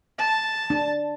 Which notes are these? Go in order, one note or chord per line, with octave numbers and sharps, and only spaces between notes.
A5
D4